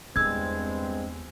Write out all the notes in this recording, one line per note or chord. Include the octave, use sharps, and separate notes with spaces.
E2 G2 G#3 C4 E6 G#6